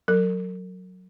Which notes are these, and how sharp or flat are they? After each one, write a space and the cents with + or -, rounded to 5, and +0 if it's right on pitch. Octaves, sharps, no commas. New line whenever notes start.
F#3 -10 A#4 -45